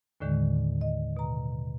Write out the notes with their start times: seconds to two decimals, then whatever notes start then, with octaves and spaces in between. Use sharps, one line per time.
0.20 D#2 A2 D3 D#3 G#3
0.81 D#5
1.17 B2 A#5